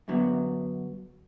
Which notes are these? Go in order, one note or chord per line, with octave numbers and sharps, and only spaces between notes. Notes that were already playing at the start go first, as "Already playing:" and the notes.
F#2 D3 F#3 B3